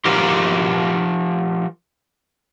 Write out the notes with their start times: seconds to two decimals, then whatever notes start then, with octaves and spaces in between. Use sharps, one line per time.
0.05 F3 G4 A#4 C5